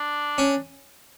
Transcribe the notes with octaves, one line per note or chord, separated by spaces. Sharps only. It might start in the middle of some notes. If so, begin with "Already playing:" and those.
Already playing: D4
C#4